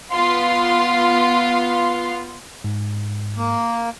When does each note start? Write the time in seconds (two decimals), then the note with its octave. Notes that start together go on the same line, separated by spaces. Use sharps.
0.11 B3 F4 F5 C6
2.64 G#2
3.37 A#3